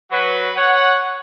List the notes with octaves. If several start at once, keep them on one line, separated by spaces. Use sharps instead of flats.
F#3 F#4 B4
C#5 F#5